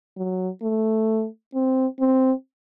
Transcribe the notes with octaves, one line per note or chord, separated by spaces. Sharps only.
F#3
A3
C4
C4